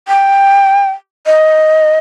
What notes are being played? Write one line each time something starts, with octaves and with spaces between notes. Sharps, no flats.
G5
D#5